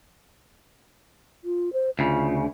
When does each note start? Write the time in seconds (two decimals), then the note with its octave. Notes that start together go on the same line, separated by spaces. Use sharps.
1.44 F4
1.73 C5
1.99 D2 C#3 F4